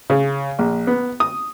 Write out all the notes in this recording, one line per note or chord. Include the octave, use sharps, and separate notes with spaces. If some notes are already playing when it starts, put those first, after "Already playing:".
C#3
A#1
B3
D#6